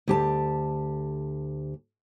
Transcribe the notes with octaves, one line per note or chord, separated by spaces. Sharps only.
D2 G4 A5